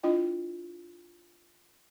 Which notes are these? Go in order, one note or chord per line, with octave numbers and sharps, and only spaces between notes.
D4 E4 F4 D#5 G5